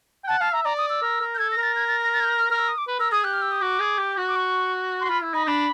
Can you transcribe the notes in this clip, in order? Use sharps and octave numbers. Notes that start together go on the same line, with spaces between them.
G5
F#5 A5
F5 A5
E5 A#5
D5 A#5
D#6
E6
A#4
A#4
G6
A4 G#6
A#6
A#4
A6
G#6
A6
A#6
A6
G#6
G6
F6
A#4 F6
E6
D#6
D6
B4
A#4 E6
G#4 D#6
G4 F#6
F6
E6
D#6
F#4 D6
G#4
G4
F#4
D6
C#6
F#4 C6
F4 B5
E4
D#4 B5
D4 B5